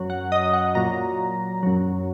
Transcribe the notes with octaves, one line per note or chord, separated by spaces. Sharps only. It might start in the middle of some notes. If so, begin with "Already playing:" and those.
Already playing: F#2 F#3
F#5
D#5
F#5
A#2 F#3 A#5
F#2 F#3